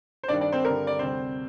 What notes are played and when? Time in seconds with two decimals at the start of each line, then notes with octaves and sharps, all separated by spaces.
0.23 C5
0.28 G2 D#3 G3 D4 D5
0.41 D4 D5
0.52 C4 C5
0.65 G2 D3 G3 A#4
0.87 D5
0.99 D2 C3 G3 C4 C5